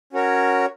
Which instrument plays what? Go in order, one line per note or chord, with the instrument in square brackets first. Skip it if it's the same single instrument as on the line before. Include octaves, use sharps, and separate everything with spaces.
[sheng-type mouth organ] C#4 F#4 A#4 C#5